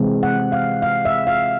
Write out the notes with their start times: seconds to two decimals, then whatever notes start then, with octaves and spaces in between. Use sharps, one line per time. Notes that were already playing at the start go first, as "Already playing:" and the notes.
Already playing: C3 E3 G#3 C4
0.23 F#5
0.52 F5
0.82 F5
1.05 E5
1.27 F5